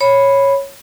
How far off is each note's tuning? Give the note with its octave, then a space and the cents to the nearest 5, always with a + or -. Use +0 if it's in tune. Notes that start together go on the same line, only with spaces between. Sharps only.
C#5 -10 B5 +0